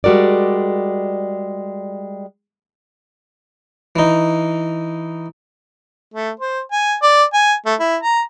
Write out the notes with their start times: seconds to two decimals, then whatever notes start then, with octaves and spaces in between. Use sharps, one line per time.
0.04 G3 G#3 F#4 A#4 D5
3.96 E3 D#4
6.14 A3
6.40 C5
6.72 G#5
7.03 D5
7.34 G#5
7.66 A3
7.80 E4
8.03 A#5